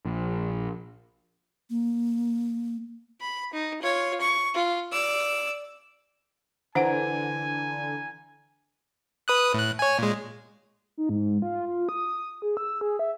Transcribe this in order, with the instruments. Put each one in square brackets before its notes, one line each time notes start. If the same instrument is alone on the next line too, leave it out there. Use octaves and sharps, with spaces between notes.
[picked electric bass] A#1
[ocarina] A#3
[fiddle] B5
D#4
F4 C#5
C#6
F4
D5 E6
[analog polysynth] D3 [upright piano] E3 A#5 D7 [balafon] D4 C5 F#5 [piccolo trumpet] G#5
[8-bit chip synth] B4 D#6 F#6
A2 F#6
C#5 G#5
A#2 G#3
[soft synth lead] D#4
G#2
F4
F4
D#6
G#4
E6
G#4
E5